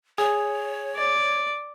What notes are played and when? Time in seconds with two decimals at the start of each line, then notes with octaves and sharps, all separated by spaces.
0.18 G#4 C#5
0.96 D5